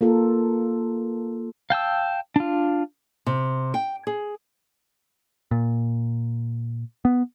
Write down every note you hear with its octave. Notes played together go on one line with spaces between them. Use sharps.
A#3 F4 A4 A#4
F5 G5 A5 E6
D4 F4
C3
G5
G#4
A#2
B3